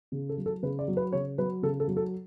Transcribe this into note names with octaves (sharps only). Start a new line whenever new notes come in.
C#3
A4
F#3
A4
C#3 B4
D5
F#3
B4
C#3 C#5
F#3 B4
C#3 A4
A4
F#3
A4